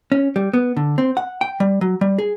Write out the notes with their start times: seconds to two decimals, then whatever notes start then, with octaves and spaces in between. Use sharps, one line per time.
0.12 C#4
0.36 G3
0.54 B3
0.77 D3
0.98 C4
1.17 F#5
1.41 G5
1.60 G3
1.81 F#3
2.01 G3
2.18 G#4